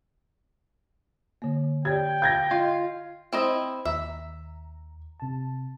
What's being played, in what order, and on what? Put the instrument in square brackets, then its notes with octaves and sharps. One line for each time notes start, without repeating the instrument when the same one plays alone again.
[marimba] D3 A#3
[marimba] G4 C#5 D5 [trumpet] G5 [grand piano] G#6
[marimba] F5 [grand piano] G6 G#6 A#6
[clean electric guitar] F4 [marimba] D#5
[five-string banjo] C4 E4 D#5
[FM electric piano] D#2 A#5 [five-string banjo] E5
[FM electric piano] C3 A5